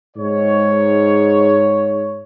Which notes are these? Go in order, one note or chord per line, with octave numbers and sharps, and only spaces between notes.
G#2 C#5